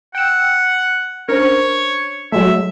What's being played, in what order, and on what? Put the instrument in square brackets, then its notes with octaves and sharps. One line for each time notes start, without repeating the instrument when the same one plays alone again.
[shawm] F#5 [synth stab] G5 E6
[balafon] C#4 D4 C5 [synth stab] A#4 [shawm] C#5
[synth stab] F#3 G#3 A3 [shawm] E5